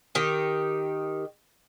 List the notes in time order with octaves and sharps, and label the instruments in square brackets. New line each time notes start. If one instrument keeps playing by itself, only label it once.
[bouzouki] D#3 G4